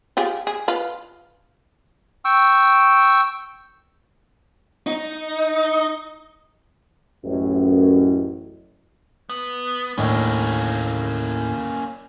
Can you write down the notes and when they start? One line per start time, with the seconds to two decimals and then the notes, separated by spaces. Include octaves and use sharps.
0.17 F4 G4 G#4
0.47 G#4
0.68 F4 B4
2.25 G5 C#6 E6
4.87 D#4
7.24 A1 F#2
9.29 B3
9.98 D#2 A2 A#3 C#4 D4